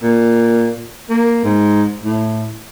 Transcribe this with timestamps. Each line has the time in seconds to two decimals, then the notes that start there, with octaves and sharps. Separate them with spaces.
0.02 A#2
1.09 A#3
1.44 G#2
2.03 A2